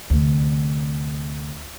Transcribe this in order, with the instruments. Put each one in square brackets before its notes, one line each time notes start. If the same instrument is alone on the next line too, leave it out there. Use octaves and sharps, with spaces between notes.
[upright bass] D2 C3